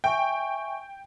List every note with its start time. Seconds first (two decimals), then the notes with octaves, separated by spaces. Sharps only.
0.04 E5 G5 G#5 C#6